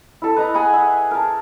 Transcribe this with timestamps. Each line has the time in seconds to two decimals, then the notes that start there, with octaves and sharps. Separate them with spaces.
0.22 E4 A4
0.36 B4 D#5 A#5
0.54 G#4 F#5 G#5 B5
0.74 E5
1.11 A#4 A5